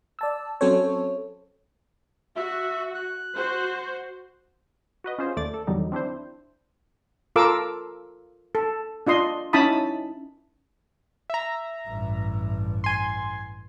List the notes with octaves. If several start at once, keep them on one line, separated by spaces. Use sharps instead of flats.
D5 A5 E6
F#3 C4 C#4 A4 C5 C#5
F#4 E5
F#6
F#4 C5
F#4 B4 D#5
C#4 F4 G#4 C5
D#2 A3 D5 A6
A4
E2 D3 D#3 F#3 G3 D#4
C4 D4 E4 C5
F4 A4 A#4 F5 D6 E6
A4
D4 F4 D#5 C6
C#4 D#4 E4 A5 B5 D#6
E5 A#5
A1 G2
G#5 C6